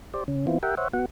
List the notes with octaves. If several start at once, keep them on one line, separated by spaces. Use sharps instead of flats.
G4 C5 D5
C#3 C#4
E3 B3 C4 E4 F4
G4 A#4 E5 F#5 G5
C5 C#5 E5 F#5
B3 F#4 F#5